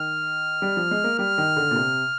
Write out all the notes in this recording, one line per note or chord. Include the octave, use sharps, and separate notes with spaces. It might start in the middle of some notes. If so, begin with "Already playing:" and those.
Already playing: D#3 F6
G3
F3
G#3
A#3
G3 F6
D#3
D3
A#2
C3